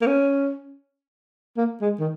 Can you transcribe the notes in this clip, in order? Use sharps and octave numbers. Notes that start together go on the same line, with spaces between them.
A#3
C#4
A#3
G#3
D#3